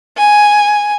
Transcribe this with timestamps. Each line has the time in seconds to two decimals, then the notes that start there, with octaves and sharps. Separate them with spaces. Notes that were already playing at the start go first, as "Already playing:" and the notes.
0.18 G#5